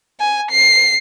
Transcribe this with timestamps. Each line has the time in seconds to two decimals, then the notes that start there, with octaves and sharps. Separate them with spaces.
0.20 G#5
0.51 C7